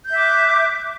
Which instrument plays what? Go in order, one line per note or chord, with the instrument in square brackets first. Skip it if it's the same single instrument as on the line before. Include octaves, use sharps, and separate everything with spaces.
[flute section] G6
E5
D6
F#6